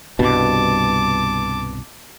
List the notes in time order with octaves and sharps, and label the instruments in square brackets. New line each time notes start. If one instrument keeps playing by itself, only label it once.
[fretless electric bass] C2 G2 B2 [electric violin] A5 D6